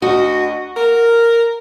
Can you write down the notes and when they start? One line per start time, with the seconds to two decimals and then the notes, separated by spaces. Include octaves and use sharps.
0.02 D2 F#4 D#5
0.77 A#4